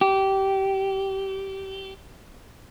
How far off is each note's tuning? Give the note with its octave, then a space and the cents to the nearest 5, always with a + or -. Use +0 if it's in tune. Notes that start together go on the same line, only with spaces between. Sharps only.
G4 -20